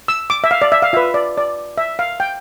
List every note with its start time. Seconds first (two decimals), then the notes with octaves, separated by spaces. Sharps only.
0.08 E6
0.30 D6
0.44 E5
0.51 F5
0.62 D5
0.72 E5
0.82 F5
0.93 F4 B4 E5
1.14 D5
1.38 D5
1.78 E5
1.99 F5
2.20 G5